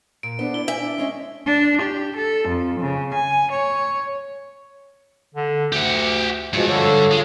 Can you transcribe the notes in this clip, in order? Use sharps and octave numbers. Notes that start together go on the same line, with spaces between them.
A#2 D7
B3 D4 A4 C5
E4 D5 G7
E5 G#5
D4
G#3 C#4 C#5 D#5
D4
G4
A4
F2
C#3
G#5
C#5
D3
D2 G4 F#5
G2 B2 F3 G#3
D3 A4 C#5
G#3 F4